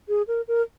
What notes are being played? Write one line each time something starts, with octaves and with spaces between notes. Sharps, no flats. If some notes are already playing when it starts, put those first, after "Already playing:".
G#4
A#4
A#4